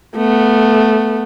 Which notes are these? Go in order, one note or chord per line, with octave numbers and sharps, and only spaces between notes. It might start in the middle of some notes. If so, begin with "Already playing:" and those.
A3 B3